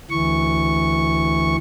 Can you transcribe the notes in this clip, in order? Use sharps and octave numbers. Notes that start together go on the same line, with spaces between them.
D2 E3 C#6